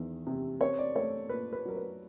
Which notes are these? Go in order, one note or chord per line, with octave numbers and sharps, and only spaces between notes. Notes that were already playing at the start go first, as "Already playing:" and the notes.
Already playing: E2 D#3
C3
C4 C#5
D5
A3 C#5
A#2 B4
B4
F#3 A#4
B4